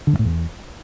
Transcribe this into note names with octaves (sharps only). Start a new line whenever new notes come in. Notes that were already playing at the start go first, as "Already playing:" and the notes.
D3
F#2
A2
E2